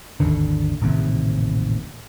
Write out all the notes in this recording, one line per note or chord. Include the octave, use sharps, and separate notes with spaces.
G#1 D#2 D3
D#1 A1 D#2 C3